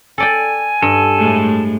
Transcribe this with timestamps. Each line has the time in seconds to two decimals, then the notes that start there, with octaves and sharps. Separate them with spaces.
0.18 A4 D5 G5 G#5
0.82 G2 A4
1.17 A2 G#3 A3